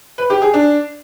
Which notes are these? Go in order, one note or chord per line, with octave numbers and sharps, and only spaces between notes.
B4
G4
G#4
D4